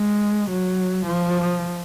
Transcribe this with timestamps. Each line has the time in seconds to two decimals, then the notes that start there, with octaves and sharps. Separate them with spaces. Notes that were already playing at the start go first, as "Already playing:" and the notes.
Already playing: G#3
0.50 F#3
1.06 F3